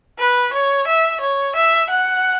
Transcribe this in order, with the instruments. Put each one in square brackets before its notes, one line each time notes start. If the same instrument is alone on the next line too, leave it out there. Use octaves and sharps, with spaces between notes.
[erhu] B4
C#5
E5
C#5
E5
F#5